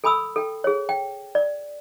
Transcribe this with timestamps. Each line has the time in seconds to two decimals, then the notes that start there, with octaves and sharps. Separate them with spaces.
0.04 A4 G#5 B5 D#6 E6
0.36 A4 G5
0.64 G#4 C#5
0.89 G5
1.35 D5